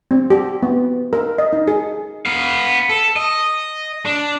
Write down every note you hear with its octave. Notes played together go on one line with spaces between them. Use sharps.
C4
G4
B3
A#4
D#5
D#4
G#4
B3 F5
A4
D#5
D4